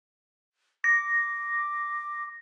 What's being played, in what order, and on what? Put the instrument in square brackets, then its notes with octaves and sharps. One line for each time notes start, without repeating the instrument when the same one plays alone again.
[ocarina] D6 [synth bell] A#6